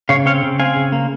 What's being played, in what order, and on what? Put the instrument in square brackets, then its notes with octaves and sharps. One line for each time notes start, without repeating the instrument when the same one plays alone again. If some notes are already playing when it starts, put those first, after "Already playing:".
[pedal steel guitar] C#3 C#5 F5
C4 C#5 F5
C#3
C4 F5 G#5
C#3
A#3